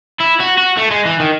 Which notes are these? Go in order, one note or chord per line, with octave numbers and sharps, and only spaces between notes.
E4
F#4
F#4
A3
G#3
E3
D#3